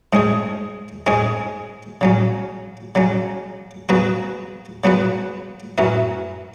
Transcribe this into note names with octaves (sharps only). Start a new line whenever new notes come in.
G#2 G#3 C#4 G#4
G#2 G#3 C#4 G#4
C#3 F#3 C#4
C#3 F#3 C#4
C#3 F#3 B3 F#4 B4
C#3 F#3 B3 F#4 B4
F#2 F#3 C#4 E4 B4